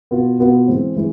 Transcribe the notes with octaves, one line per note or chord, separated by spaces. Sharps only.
B2 B3 F4
B2 B3 F4
E3 G#3 C4
E3 G#3